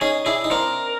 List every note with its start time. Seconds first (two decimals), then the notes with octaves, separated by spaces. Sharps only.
0.01 C#4 D#4 G#4
0.26 D4 E4 G#4
0.44 D#4
0.51 C4 D4 A#4